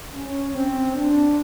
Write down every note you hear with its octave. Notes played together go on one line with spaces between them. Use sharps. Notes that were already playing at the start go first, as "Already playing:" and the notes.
C#4
C4
D4